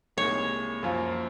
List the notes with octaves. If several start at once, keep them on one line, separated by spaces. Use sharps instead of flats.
C2 A#2 G#3 D#4 C#5
F#2 F3 A#3 F4